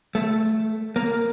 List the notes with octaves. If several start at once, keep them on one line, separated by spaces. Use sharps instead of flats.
A3
A#3